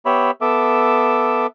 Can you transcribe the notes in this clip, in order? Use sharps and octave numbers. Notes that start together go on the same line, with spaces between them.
B3 G4 C#5 E5 B5
B3 A4 E5 D6